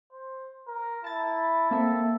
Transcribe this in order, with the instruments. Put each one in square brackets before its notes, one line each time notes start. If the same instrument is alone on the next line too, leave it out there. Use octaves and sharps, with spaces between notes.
[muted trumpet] C5
A#4
[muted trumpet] E4 [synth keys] A5 A6
[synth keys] A#3 C4 E5 [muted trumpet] A4